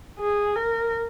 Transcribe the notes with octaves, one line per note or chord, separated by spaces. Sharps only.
G#4
A#4